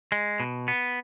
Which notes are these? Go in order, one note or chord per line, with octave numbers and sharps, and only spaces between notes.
G#3
B2
B3